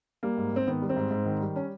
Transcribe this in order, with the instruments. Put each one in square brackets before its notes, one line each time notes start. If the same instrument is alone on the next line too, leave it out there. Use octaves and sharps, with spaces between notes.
[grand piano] G3 A#3
G#2
G#2 C4
D#3 B3
G3
C4
G#2
G#2
D#3
G3
C#4